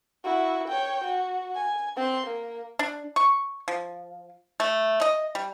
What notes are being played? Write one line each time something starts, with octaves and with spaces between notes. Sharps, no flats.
E4 F#4
C#5 G5
F#4
G#5
C4 C6
A#3
D4
C#6
F3
A3
D#5
G3